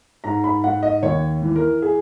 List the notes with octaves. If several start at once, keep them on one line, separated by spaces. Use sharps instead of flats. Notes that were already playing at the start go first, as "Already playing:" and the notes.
G#2 A#5
B5
G#2 F#5
D#5
D#2 C#5
E3
A#4
G#4